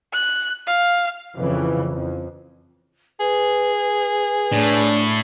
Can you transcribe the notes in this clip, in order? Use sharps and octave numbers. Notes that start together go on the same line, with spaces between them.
F#6
F5
F2 C#3 E3
F2
G#4 B4
A2 D4